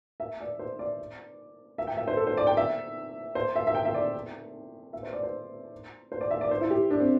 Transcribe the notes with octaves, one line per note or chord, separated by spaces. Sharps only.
E5
D5
C5
D5
E5
G5
E5
C5
A4
C5
D5
G5
E5
C5
E5
E5
G5
E5
D5
E5
C5
D5
C5
C5
D5
E5
D5
C5
E4
G4
D4
C4